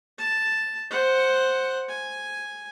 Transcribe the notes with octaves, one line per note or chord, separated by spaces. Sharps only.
A5
C5 F#5
G#5